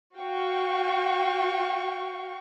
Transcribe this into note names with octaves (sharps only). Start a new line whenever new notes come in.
F#4 F5 G5 C#6